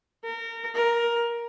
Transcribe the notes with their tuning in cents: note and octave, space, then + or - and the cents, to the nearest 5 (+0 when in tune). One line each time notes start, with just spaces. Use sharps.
A#4 -25
A#4 +10